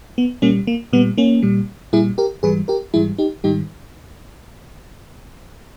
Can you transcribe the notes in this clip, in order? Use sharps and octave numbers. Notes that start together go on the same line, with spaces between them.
B3
A#2 G3 A#3 C#4
A#3
A#2 G3 B3
A#3 C#4
A#2 G3
A#2 G3 E4 G#4
G4 A#4
G#2 E3 G3 G#4 B4
G4 A#4
G#2 E3 G3 E4 G#4
D#4 G4
G#2 D#3 G3 D#4 G4